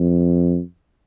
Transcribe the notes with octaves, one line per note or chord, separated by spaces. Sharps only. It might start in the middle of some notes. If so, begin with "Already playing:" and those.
Already playing: F2